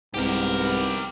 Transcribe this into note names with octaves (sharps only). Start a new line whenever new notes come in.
C2 G#2 B3 G4 A#4